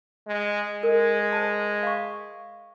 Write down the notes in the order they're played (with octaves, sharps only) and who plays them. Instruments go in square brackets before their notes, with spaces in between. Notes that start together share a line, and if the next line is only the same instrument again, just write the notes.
[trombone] G#3
[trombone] G#3 [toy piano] A#4
[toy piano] C5 A5
F5 C#6